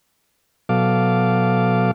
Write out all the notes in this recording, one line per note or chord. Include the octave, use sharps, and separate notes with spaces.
B2 F#3 A4 F5 D6